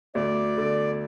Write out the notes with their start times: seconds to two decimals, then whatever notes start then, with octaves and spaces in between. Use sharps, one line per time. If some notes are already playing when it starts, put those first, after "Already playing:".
0.14 D2 D5
0.58 D3